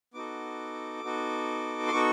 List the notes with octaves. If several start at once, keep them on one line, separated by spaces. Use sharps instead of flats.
B3 D#4 F#4 A4 D6
B3 D#4 F#4 A4
C6
B3 D#4 F#4 A4 C#6